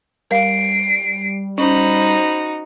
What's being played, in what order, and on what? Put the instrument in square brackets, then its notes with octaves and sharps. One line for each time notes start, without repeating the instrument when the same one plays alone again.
[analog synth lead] G3 [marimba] A#4 F5 [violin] C7 D7
[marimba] C#4 [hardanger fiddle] D#4 F#4 [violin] C5 B5